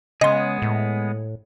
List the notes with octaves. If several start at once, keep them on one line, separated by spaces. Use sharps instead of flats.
C#3 G#3 B3 G#4 D#5 C6
A2